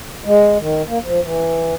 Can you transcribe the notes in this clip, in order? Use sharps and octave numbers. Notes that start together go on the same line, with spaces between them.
G#3
D#3
A#3
F3
E3